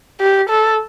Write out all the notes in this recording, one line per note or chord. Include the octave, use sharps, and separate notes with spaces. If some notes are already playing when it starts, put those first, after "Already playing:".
G4
A4